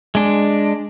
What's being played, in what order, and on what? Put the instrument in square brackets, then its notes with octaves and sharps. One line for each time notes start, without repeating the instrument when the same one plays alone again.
[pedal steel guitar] G#3 D4